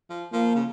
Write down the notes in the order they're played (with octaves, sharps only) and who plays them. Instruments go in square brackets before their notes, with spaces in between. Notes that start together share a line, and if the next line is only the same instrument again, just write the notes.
[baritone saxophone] F3
[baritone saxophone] F3 [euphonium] A#3
[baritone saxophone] C#3